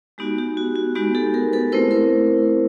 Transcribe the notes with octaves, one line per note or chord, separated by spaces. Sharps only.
G#3 B3 D#4 F#4 G4
G4
F#4
F#4
G#3 B3 D#4 F#4 G4
G4 A4
G#4 A#4
A4 B4
A3 C4 E4 A#4 C5
A#4 C5